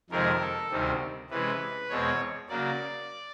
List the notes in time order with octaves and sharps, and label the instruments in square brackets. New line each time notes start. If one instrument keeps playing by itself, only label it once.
[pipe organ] F2 C3 D#3 G#3 C4 A#4
A4
D2 C3 D#3 G3 C4
C3 E3 G#3 C#4 B4
E2 B2 G#3 C4 C#5
C#3 F#3 A#3 D5